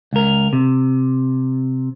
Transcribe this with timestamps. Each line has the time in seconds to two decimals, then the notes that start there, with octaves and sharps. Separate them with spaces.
0.13 C#2 A#4
0.53 C3